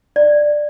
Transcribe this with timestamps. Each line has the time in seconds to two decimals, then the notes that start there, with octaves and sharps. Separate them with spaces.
0.16 D5